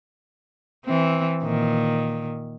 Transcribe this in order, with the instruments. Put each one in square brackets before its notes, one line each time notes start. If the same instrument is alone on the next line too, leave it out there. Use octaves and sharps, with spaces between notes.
[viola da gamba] E3 C4
A#2 D#3